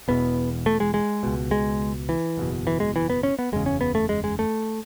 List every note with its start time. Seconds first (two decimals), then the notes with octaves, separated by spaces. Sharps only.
0.08 E1 E2 B2 B3
0.66 A3
0.80 G#3
0.94 G#3
1.23 C#2 B2
1.51 G#3
2.09 E3
2.37 F#1 E2 B2
2.67 E3
2.80 G#3
2.96 E3
3.10 B3
3.23 C#4
3.39 B3
3.52 F#1 E2 C#3 G#3
3.66 C#4
3.81 B3
3.95 A3
4.09 G#3
4.24 G#3
4.39 A3